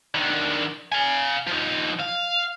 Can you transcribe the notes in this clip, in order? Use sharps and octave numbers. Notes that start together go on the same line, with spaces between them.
D3 D#3
F5 G#5
F3 D#4
F5